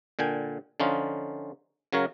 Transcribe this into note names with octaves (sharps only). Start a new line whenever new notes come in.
A#2 D3 G5 G#5
D3 F3 C#4 D#4 F4
C#3 F#3 A#4 C#5 F5